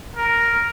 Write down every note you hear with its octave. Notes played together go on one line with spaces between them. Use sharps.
A#4